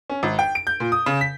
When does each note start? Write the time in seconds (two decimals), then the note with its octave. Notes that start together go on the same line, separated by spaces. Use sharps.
0.10 C#4
0.23 G#1
0.39 G5
0.55 D7
0.67 G6
0.80 A#2
0.92 D#6
1.06 C#3
1.21 B6